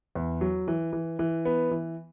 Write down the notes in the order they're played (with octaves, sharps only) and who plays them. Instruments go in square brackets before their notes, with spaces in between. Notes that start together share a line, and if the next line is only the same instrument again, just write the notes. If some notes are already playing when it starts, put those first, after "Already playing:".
[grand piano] E2
F#3
E3
E3
E3
B3
E3